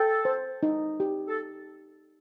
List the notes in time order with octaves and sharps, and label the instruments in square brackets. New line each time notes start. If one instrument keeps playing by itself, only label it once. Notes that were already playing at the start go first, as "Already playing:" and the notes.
Already playing: [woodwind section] A4 [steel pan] G5
[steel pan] C5
D#4
G4
[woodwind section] A4